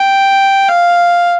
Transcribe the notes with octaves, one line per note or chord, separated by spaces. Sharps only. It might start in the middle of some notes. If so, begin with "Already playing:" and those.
Already playing: G5
F5